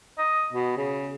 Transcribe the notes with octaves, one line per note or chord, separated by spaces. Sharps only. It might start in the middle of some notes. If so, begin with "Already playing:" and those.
D#5
B2
C#3